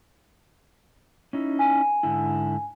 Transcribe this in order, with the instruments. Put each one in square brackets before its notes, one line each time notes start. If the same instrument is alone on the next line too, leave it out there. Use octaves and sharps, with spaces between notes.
[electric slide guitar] C#4 D#4 E4
[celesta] G#5
[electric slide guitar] G#2 D3 E4